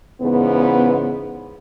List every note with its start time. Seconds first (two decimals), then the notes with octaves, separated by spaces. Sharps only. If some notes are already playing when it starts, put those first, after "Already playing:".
0.20 E2 G#2 C#3 B3